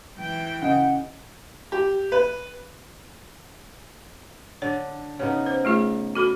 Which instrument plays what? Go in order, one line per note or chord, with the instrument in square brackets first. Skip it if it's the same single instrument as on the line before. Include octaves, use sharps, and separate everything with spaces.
[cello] E3 G5
[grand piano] C#3 D#5 [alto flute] F#5
[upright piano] G4
B4
[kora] D3 [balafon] C#5
[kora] C#3 B3 D#4
[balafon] C5
A3 F4 G#4
F#4 A4 B5